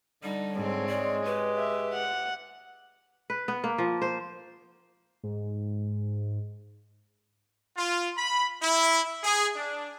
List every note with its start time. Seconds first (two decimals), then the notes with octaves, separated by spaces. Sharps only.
0.23 D3 G3 D#4
0.54 G#2 C4 C#5
0.89 G#3 D5
1.25 G4 B4
1.57 E5
1.94 F#5
3.30 B4
3.48 B3
3.64 A#3
3.78 F3
4.02 C5
5.24 G#2
7.77 F4
8.17 B5
8.61 E4
9.23 G#4
9.56 D4